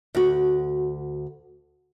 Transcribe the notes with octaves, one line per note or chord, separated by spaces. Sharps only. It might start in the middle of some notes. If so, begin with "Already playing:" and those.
D2 F#4